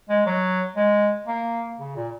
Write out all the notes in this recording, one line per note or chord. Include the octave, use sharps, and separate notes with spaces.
G#3
F#3
G#3
A#3
C#3
A#2